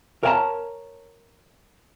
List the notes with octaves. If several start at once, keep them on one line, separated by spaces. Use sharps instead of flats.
A#4 C#5 F5 G5 A5 A#5